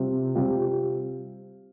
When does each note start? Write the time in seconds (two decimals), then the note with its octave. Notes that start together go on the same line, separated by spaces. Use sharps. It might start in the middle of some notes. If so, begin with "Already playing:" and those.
Already playing: C3 G3 C4 F4
0.35 C3 G3 C4 F4